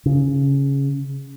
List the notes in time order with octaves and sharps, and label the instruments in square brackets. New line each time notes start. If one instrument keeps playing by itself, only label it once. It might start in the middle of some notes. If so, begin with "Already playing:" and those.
[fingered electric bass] C#3